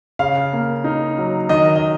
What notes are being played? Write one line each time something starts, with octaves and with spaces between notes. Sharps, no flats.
C#3 F5
A#3
D#4
F#3
D#3 D#5
D#5